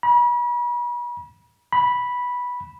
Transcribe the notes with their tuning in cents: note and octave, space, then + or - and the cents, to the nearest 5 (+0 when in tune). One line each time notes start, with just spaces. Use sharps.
B5 -40
B5 -10